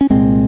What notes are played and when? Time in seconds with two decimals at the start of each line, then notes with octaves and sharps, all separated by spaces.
0.01 C#4
0.10 C2 A#2 G#3 C4